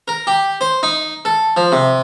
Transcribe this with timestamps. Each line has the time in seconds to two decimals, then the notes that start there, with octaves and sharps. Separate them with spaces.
0.08 A#4
0.27 G4
0.61 C5
0.83 D#4
1.25 A4
1.57 F3
1.72 C3